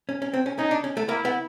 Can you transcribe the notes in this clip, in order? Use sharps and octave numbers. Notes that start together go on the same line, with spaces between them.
C#4
C#4
C4
C#4
C#4 D#4
D4
C#4
A3
A#3 E4
B3